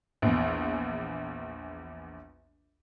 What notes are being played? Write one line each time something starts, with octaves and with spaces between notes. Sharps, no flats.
A#1 E2